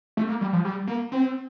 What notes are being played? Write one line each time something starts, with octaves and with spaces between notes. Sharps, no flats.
A3
A#3
G3
F3
G3
A#3
C4